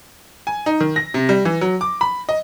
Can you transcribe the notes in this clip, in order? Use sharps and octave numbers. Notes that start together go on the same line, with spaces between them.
G#5
D#4
D#3
A#6
C3
G3
E3
F#3
D6
B5
D#5